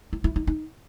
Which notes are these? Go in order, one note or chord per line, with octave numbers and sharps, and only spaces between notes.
E4
E4
D#4
D#4